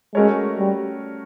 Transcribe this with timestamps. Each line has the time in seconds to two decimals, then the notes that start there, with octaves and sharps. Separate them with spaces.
0.15 G#3 A3 C#4 F#4 A#4 C#5
0.58 G3